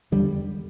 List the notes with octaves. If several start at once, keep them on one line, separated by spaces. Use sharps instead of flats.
E2 D3 G3